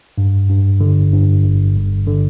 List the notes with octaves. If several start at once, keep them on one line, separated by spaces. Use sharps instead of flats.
G2
G2
D3
G2
G1
G1
D3